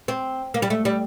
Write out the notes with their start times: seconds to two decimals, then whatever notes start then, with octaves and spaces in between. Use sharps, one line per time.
0.08 C4
0.54 A#3
0.62 G3
0.70 A3
0.85 G3